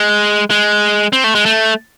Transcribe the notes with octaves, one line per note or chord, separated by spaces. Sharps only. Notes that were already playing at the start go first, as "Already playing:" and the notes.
Already playing: G#3
G#3
C4
A3
G#3
A3